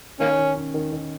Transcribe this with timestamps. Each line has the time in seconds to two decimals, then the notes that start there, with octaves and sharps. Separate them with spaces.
0.20 D#3 A#3 C#4
0.38 D#3
0.56 C#4
0.74 D#3
0.93 D#3